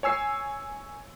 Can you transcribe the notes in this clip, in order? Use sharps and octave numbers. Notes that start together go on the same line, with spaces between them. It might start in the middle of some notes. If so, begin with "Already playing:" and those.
C#5 G#5 E6 C7